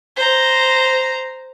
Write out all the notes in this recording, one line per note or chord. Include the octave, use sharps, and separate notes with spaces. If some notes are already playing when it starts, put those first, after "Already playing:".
C5 A#5